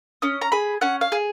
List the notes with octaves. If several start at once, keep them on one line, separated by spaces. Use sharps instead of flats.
C#4 D#6
A#5
G#4 B5
C#4 F#5
F5
G#4